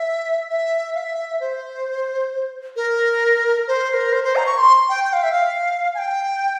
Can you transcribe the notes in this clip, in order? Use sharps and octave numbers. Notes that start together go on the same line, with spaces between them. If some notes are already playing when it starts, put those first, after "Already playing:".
Already playing: E5
E5
F5
E5
C5
A#4
C5
C5
A#4
C5
C5
A#5
C#6
C6
G5
G5
F5
E5
F5
G#5
G5